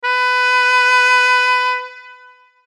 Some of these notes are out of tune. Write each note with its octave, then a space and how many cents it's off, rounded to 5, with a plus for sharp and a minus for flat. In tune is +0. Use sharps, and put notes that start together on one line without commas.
B4 +20